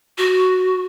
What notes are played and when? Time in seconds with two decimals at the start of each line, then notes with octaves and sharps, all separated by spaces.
0.18 F#4